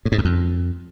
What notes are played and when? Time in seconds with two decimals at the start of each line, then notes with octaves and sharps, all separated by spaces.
0.05 A2
0.12 G#2
0.18 F#2
0.25 F2